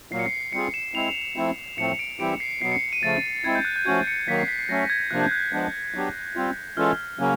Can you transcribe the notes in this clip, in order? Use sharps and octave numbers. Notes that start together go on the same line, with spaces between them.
A#2 F#3 A#3 C7
C#7
C7
G3 C4 F4 G#4 C#7
E7
G#3 C4 E4 F7
F3 A3 C4 E4
A2 F3 A3 C4 C#7
D7
E3 G3 C4 E4 G4 D7
C7
B2 F#3 B3 C7
C#7
D#7
C#3 F3 A3 A6
G#3 C4 E4 G#6
G6
F#6
G6
F3 A3 C#4 F#4 G#6
C#7
D#3 F#3 A#3 B6
C7
B6
C7
F#3 A3 C#4 A#6
G#6
C3 F3 A#3 D4 F#6
G6
F#6
F3 G#3 B3 D4
F#3 B3 D4 G4
G3 C4 F4
E3 G#3 C#4 F4 A4 F6
C#3 F#3 A#3 C#4